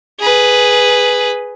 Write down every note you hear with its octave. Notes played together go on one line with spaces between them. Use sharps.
G#4 B4